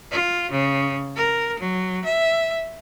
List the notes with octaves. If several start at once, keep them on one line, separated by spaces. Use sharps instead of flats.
F4
C#3
A#4
F#3
E5